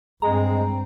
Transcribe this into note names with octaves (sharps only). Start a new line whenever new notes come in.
G2 G#3 C4 A#5